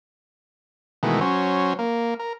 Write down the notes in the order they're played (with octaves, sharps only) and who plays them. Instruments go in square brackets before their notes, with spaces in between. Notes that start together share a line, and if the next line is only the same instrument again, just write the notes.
[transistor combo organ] B2 D#3 E3 G#3 A3
F#3 C#4 C5
A#3
A#4